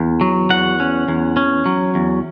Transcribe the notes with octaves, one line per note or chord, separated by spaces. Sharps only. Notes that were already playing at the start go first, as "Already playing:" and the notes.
Already playing: E2
F#3
E2 F#5
C#4
E2
C#4
F#3
E2